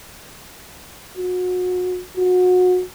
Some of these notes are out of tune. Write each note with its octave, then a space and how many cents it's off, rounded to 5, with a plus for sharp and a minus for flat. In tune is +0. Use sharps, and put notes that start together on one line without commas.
F#4 -30
F#4 -25